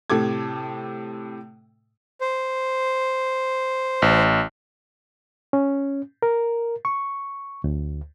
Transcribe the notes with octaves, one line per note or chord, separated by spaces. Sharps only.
A2 C3 A4 D6 G#6
C5
A1
C#4
A#4
C#6
D2